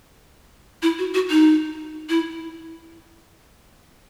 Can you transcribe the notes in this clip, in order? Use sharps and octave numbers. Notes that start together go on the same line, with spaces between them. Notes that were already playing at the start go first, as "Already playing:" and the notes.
E4
F#4
F#4
D#4
E4